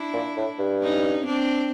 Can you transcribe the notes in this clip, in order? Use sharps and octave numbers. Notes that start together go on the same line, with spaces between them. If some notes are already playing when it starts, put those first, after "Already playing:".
Already playing: D4 E4
A#2
A2
G2
C#4 D#4
C4 D4